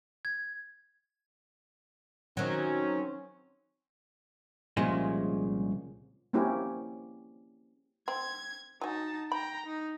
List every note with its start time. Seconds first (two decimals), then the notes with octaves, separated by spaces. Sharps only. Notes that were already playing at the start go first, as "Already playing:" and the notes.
0.25 G#6
2.37 D#3 F#3 C4 C#4
4.77 C2 A#2 C#3 F3 G#3
6.33 A#3 C4 C#4 E4 G4
8.08 C4 G#6
8.81 F#3 D#4 G#5 A5
9.32 G5 A#5 B5
9.66 D#4